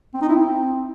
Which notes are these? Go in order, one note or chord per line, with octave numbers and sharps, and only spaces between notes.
C4
D#4
E4
C4